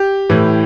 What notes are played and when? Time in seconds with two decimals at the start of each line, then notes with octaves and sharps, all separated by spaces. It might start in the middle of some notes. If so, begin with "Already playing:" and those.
Already playing: G4
0.30 A2 E3